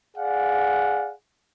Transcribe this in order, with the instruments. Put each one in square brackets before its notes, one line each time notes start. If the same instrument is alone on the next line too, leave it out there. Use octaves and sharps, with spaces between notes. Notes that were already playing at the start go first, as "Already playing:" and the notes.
[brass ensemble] G#4 D5 F5 F#5